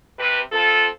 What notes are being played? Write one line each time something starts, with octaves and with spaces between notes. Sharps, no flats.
C3 B4
C4 F4 A4